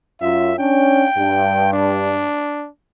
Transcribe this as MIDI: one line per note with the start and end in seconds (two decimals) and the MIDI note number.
0.21 0.53 42
0.21 0.53 65
0.21 0.54 76
0.59 1.05 61
0.59 1.05 62
0.59 1.72 79
1.17 2.24 43
1.73 2.69 62